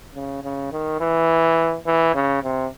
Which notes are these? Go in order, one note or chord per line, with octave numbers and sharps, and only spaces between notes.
C#3
C#3
D#3
E3
E3
C#3
C3